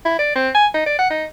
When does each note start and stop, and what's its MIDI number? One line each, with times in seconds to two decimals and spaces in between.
0.05 0.17 64
0.19 0.33 74
0.35 0.49 60
0.54 0.66 80
0.74 0.83 63
0.86 0.96 74
0.99 1.07 78
1.10 1.25 63